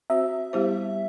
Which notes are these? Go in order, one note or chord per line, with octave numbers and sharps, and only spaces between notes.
C4 F#4 C5 E5
G3 B3 E4 G4 C5